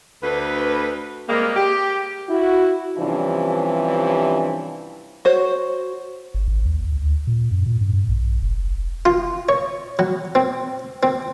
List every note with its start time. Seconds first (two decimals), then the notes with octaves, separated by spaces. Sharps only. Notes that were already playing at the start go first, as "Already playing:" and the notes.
0.23 D2 B4
1.29 C3 G3 G#3 A#3
1.56 G4
2.28 E4 F#4
2.98 G2 C3 E3 F3 C#4 D4
5.25 F#4 C5 C#5
6.34 G1
6.48 G#1
6.65 D#2
6.92 D2
7.27 A#2
7.51 F#2
7.66 A#2
7.81 G2
7.93 G2
8.09 A#1
8.42 F1
9.05 F4
9.49 C#5
9.99 F#3
10.35 C4
11.03 C4